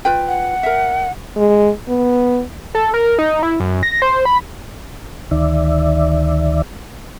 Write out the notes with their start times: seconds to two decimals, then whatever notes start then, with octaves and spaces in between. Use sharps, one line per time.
0.05 F4 B4 G5
0.28 F#5
0.63 A#4 E5
1.36 G#3
1.89 B3
2.75 A4
2.94 A#4
3.18 D#4
3.43 E4
3.60 F#2
3.83 A#6
4.02 C5
4.25 B5
5.31 D2 D#3 D5 E5